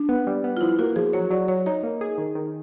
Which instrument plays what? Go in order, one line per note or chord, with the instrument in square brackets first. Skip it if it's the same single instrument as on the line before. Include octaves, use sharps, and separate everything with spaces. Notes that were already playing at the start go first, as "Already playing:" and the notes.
Already playing: [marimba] D4
[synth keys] B3
G3
B3
[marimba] F4
[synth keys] F3 [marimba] E4
[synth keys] A#3 [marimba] F#4
[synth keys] F3 [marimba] G#4
[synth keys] F#3 [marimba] C#5
[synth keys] F#3 [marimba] D5
[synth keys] F#3 [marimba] C#5
[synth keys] D#4 [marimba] C#5
[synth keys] A#3
G#4
D#3
D#3